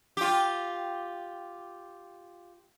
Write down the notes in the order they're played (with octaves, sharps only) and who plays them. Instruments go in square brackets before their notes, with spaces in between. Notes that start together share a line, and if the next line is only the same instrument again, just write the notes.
[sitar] F4 G4